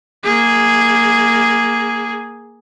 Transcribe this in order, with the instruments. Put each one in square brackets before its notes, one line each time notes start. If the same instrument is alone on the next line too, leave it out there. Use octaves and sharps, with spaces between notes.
[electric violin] A#3 G#4